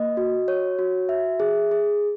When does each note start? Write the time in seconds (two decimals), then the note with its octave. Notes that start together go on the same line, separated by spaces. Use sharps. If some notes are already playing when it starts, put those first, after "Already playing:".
Already playing: A#3 D#5
0.17 F#4
0.48 C#5
0.79 F#4
1.09 E5
1.40 G#4
1.71 G#4